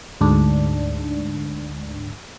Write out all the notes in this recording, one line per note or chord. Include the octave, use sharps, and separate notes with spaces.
D2 G#2 D4